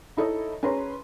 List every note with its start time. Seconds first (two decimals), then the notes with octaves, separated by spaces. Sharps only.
0.17 D#4 E4 A4 C#5 D#5
0.63 C#4 G#4 B4 C#5 A#5 C6